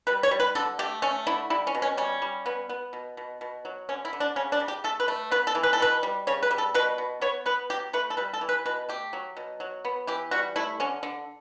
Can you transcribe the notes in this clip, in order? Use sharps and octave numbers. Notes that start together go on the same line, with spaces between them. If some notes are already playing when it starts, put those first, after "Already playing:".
G3 B4
C#5
G3
B4
D3 A4
A3 G4
A3 C#4
D3 E4
G3 E4
C#4
B2
C#4
G3 C#4
G3
B3
B3
B2
B2
B2
F#3
D3 C#4
E4
D3
D4
C#3 C#4
D4
C#3
G4
A3 A4
B4
A3
B3 B4
A4
E3
B4
A4
B2 B4
G3
C#3 C#5
B4
G3
A4
B2 B4
B2
B3 C#5
B3 B4
F#3 G4
A3 B4
A4
G3 B4
A4
E3
B4
B2 B4
A3 G4
F#3
B2
F#3
B3
E3 G4
G3 F#4
A3 E4
D3 C#4
D3